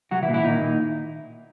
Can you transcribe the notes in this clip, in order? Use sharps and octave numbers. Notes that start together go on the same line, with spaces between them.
C2 F#3 F#4
E3 E4
A#2
E3 E4
A#2 D#3 D#4
A#2